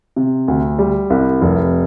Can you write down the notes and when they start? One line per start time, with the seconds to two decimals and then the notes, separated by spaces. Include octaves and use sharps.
0.16 C3
0.48 D2
0.79 G3
1.10 C2
1.41 F1